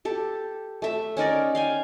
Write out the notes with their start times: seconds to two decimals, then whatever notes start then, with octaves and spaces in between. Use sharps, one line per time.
0.05 G4 A4
0.82 A3 E5
1.17 C#4 D#4 A#4 D5
1.55 F5 G5 G#5